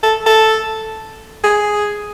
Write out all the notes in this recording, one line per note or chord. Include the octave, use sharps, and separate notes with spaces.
A4
A4
G#4